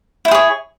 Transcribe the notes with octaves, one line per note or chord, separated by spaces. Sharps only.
E4 G#4 C5 C#5